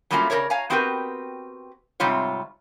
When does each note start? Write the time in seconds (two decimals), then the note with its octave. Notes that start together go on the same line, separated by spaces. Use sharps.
0.11 F#3 G3 A3 A#3 C#4 F4
0.30 C#3 E3 A#4 C#5 D5
0.50 C#5 F5 G#5 A#5
0.70 B3 C4 F#4 G4 A#4 B4
2.00 G#2 C3 G3 C4 F4 C#5